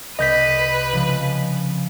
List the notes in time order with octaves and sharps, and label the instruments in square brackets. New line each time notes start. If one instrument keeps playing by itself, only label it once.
[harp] C2 D7 [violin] B4 [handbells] D#5 G6 B6
[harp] C#3 F3 G#3